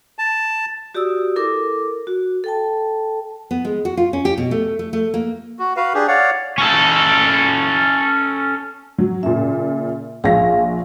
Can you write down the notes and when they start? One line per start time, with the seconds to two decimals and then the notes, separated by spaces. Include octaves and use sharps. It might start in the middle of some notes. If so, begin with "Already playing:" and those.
0.19 A5
0.95 F#4 G4 D5 D#6 E6
1.36 E4 A4 A#4 D6
2.07 F#4
2.44 A4 G5 A5
3.51 B3
3.65 G#3
3.85 F#4
3.97 F4
4.13 C#4
4.25 G4
4.38 B2
4.51 A3
4.79 A3
4.93 A3
5.14 A#3
5.59 F#4
5.77 F#4 B4 F5
5.94 D4 G4 G#4
6.08 C#5 D5 F5 F#5
6.58 C#4 A4
8.98 F#3
9.23 A#2 C#3 E5
10.24 A#1 G#4 F5 A#6